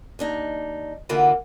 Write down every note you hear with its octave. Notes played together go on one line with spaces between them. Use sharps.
D#2 D4 D#4
D3 E3 A#3 F4 F#4 B4